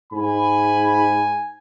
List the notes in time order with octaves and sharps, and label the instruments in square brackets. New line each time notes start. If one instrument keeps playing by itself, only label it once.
[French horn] G#2 [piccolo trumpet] G#5 [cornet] B5